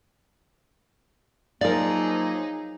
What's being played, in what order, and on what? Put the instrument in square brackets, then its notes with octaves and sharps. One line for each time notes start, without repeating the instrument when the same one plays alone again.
[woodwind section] F3 F#3 A#3 [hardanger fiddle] D#4 G#4 [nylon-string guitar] A#4 F5 [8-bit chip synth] D5